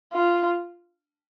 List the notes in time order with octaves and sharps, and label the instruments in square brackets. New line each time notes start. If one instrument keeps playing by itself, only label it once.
[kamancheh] F4